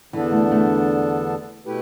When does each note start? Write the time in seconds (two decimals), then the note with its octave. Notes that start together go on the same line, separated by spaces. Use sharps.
0.13 E2 D3 E3 B3 D4 A4
0.32 A3
0.51 A3
1.65 B2 A3 E4 G4 B4